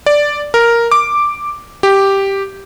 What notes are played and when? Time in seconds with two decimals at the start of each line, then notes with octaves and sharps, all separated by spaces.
0.06 D5
0.54 A#4
0.92 D6
1.83 G4